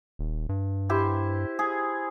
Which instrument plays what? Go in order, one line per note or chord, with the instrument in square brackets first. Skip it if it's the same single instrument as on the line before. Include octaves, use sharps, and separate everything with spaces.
[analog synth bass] D#1
G2
[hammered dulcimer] E4 G4 C5
G#4